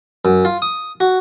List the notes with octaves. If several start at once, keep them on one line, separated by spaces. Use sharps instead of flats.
F#2
F4
D#6
F#4